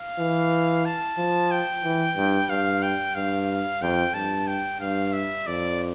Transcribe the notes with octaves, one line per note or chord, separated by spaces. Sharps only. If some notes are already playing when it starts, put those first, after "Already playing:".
Already playing: F5
E3
A5
F3
G5
E3
G2
G2 F5
G5
G2 F5
F2 G5
G2 A5
G5
G2 F5
E5
F2 D5